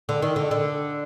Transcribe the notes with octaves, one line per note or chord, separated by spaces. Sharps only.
D3
D#3
D3
D3